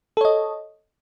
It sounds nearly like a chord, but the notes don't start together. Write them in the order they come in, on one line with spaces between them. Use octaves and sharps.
A4 C#5 D#5